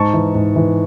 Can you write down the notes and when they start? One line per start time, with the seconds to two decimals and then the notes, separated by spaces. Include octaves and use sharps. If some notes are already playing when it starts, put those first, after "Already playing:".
Already playing: G#2 A5 C#6
0.14 E3
0.35 G#2
0.56 E3